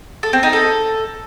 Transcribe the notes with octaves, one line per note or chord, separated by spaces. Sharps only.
A4
C4
D#4
A4